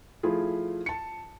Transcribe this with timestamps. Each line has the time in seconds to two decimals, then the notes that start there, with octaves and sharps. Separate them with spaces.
0.23 F3 A3 E4 F4 G#4
0.86 A5 C#7